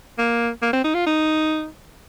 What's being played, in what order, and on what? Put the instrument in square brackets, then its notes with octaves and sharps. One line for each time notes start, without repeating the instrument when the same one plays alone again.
[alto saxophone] A#3
A#3
C4
D#4
F4
D#4